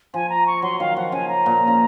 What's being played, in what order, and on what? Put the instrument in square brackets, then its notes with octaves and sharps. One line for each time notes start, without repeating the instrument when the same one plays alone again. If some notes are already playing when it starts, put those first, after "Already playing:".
[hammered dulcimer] F3 [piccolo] G#5
[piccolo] A#5
C#6
[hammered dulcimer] F#3 [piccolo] C6
[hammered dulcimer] D#3 [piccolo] F5
[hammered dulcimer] F3 [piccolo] F#5
[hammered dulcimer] C#3 [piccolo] G#5
[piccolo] A#5
[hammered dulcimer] A#2
C#3